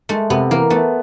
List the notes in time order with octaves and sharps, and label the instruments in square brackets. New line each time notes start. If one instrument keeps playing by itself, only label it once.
[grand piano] G#3 [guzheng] A3
[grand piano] C3 [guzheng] B3
[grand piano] E3 [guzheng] A#3
[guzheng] A3 [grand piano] B3